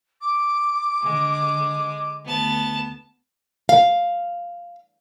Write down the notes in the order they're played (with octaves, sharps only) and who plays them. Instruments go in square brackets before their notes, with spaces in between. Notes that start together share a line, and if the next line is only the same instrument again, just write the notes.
[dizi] D6
[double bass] D3 [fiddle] G#3
[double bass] D2 [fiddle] B3 A5
[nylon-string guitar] F5